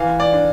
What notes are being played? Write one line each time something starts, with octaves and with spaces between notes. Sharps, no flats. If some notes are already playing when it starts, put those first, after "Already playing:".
Already playing: E3 F5
D5
D4